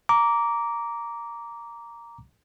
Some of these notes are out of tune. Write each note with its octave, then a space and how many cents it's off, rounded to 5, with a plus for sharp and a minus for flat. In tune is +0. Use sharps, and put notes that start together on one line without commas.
A#5 +0 D6 -15